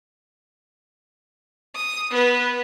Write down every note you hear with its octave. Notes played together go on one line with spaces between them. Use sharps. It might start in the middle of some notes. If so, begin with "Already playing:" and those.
D#6
B3 B4